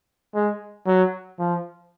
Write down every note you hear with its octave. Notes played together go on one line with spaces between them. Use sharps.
G#3
F#3
F3